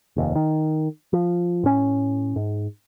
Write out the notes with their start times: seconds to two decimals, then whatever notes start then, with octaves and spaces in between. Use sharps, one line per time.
0.16 F1 D#2
0.35 D#3
1.13 F3
1.63 A2 C#4
2.36 G#2